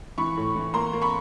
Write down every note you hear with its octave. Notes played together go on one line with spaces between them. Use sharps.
E3 B5 C#6
A2
E3
A#3 A#5 C6
A#3
B5 C#6